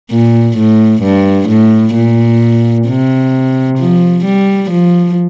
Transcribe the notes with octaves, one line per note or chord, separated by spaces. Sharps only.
A#2
A2
G2
A2
A#2
C3
F3
G3
F3